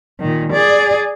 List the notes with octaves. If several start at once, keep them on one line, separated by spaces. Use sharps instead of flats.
A#2 D#3
G#4 D5